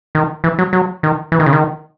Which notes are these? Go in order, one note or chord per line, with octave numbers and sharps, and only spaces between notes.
D#3
E3
F#3
F#3
D#3
E3
D#3
C#3
D#3